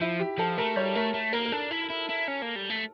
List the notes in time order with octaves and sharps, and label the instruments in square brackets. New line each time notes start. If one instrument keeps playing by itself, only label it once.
[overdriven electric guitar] F3 [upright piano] E4
[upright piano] G4
[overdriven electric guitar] F3 [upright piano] A4
[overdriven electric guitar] A3 [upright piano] A#4
[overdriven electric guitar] G3 [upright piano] C#5
[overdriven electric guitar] A3 [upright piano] A#4
[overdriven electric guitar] A3
[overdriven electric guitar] A#3 [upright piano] A#4
[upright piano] A#4
[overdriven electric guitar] D4 [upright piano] A4
[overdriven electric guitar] E4
E4
E4
C#4
A#3
G3
A3